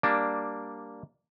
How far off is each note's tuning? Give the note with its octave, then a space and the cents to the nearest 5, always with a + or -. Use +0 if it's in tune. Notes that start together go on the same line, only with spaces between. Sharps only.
G3 +0 A#3 +0 D4 +0